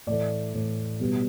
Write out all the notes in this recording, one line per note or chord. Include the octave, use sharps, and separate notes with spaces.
A2 E3 A3 D5
A2 E3 A3
B2 G3 B3